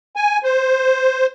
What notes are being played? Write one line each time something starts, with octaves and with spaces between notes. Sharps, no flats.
G#5
C5